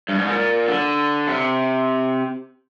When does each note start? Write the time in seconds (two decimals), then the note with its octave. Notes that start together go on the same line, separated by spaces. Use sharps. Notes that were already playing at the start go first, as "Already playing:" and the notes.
0.09 G2
0.18 G#2
0.28 A#2
0.68 D3
1.27 C3